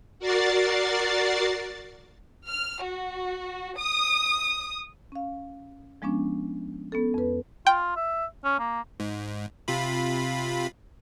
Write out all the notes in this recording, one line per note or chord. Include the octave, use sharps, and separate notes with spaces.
F#4 A#4 D5 A6 C7
F6
F#4
D#6
C#4 F5
F3 G#3 B3 C#4 D4
B3 C#4 A4
F2 B4
F4 G5
E5
C#4
A#3
G#2
C3 F4 B5